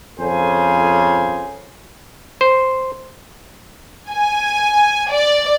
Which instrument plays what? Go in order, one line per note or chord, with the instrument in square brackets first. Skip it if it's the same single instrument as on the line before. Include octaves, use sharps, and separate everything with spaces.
[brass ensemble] F2 C#3 A4 C5 G#5
[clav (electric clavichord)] C5
[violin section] G#5
D5